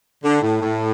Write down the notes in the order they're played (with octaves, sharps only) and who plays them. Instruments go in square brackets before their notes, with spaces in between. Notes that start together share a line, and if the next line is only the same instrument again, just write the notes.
[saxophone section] D3
A2
A2